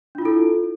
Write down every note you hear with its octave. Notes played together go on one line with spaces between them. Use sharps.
D4 E4 F4 A4